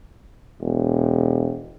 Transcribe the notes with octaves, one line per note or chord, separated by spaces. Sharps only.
E1